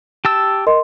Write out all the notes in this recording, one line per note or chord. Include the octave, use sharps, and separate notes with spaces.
G4 A5 E6
A#4 D#5 C6